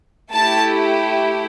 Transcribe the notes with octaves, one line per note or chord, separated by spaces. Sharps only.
A3 E4 G4 A5